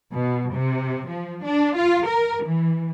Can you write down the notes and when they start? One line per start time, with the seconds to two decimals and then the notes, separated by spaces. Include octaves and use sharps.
0.12 B2
0.53 C3
1.07 F3
1.45 D4
1.75 F4
2.06 A#4
2.44 E3